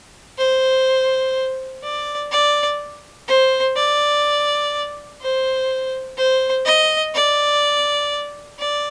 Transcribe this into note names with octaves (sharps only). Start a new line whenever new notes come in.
C5
D5
D5
C5
D5
C5
C5
D#5
D5
D5